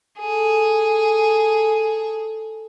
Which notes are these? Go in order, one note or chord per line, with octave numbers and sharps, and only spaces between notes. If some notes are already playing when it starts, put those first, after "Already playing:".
G#4 A4